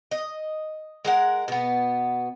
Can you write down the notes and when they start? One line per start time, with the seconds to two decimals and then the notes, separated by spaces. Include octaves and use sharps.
0.11 D#5
1.05 G#3 A#4 F#5
1.48 B2 B3